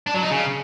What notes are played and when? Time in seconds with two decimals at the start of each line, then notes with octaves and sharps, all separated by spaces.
0.07 D4
0.15 F#3
0.23 D#4
0.30 C#3